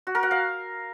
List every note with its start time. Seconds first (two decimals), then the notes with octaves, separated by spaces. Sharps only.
0.07 F#4
0.15 A#4
0.23 F#5
0.31 F5